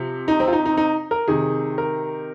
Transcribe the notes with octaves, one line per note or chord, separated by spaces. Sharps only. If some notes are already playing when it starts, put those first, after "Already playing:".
Already playing: C3 F3
D#4
C4
F4
D#4
D#4
D#4
A#4
C3 D#3 G#4
A#4